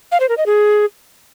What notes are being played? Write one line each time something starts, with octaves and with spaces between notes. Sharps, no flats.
F5
C5
A#4
D#5
G#4